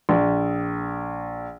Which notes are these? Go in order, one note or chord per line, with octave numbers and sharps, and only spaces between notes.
A#1